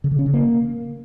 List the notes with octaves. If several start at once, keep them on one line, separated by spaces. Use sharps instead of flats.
C#3
D3
C#4
C#3
A#3